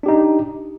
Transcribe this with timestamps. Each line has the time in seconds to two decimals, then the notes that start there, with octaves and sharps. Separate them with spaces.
0.03 D4
0.06 G4
0.08 D#4